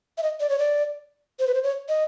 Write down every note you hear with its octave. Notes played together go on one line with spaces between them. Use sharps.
E5
D#5
D5
C#5
D5
C5
B4
C5
C#5
D#5